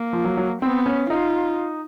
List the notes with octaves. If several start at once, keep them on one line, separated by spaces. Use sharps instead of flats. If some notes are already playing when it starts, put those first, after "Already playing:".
Already playing: A#3
F3
F#3
F#3
B3 C4
C#4
D#4 F4